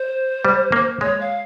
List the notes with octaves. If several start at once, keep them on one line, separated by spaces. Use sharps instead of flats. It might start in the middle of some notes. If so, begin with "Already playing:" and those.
Already playing: C5
G3
A#3
G#3 C#5
F5